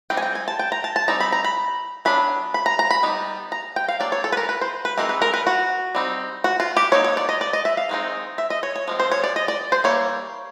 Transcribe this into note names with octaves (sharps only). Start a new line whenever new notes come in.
G3 C4 D#4 G5
G#5
G5
G#5
A5
G5
A#5
A5
A5
G3 C4 D#4 A#5
B5
A#5
B5
F#3 B3 D4 B5
B5
A#5
A#5
B5
G3 B3 D#4
A#5
G5
F5
F#3 A#3 D4 D5
C#5
A4
B4
A#4
B4
C5
B4
E3 G#3 C4 D#4 A#4
B4
A#4
B4
F#4
G3 C4 D#4
F#4
F4
G4
F#3 A#3 D#4 C#5
C#5
D5
D#5
D5
D#5
E5
F5
D#3 G#3 C4 D#4
E5
D#5
C#5
C#5
F3 G#3 C4
C5
C#5
D5
D#5
D5
C5
E3 G3 A#3 C#5